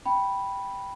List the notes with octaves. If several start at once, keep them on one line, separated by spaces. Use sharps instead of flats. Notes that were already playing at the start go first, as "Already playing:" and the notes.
G5 B5